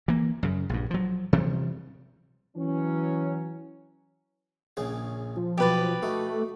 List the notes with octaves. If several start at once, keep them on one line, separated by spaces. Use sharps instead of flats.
E3 A#3
F#2 C#3
A#1 G2
F3 F#3
C3 E3 F3 G3
E3 F#3 C#4
A#1 C#3 G#4
F3
B1 B2 G4 B4 D5
A3 D#4 F#4